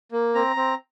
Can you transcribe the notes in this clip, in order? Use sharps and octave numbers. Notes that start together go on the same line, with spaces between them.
A#3
C4 A#5
C4